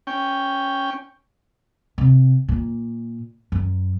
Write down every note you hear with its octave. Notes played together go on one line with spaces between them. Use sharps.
C#4 G5
C3
A#2
F#2